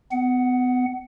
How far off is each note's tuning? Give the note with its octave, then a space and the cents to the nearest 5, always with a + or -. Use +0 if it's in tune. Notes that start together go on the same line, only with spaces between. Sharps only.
B3 +35 F#5 +5